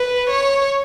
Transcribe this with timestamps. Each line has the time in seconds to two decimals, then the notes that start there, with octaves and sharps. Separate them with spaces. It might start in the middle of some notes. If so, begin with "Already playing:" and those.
Already playing: B4
0.30 C#5